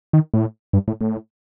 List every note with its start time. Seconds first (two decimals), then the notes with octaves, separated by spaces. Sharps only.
0.13 D#3
0.34 A2
0.73 G2
0.88 A2
1.01 A2